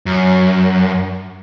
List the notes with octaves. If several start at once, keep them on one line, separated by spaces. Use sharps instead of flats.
F#2